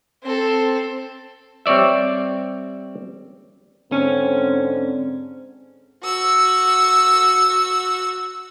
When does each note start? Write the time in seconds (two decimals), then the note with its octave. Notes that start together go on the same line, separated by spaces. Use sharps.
0.23 C4 A4
1.66 G3 C4 C#5 D5 E5
3.92 G#2 D3 C4 C#4
6.03 F#4 E6